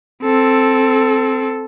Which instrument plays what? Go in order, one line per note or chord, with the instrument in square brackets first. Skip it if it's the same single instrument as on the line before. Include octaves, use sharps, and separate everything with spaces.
[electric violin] C4 A4